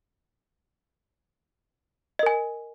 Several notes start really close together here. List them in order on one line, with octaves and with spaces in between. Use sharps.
D#5 A#4 G#5